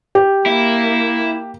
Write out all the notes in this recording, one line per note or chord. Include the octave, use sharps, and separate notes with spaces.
G4
A#3 E4